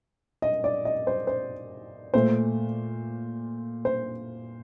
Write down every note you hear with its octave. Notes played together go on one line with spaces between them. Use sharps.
D#5
D5
D#5
C5
C5
A#2 A3 C5
C5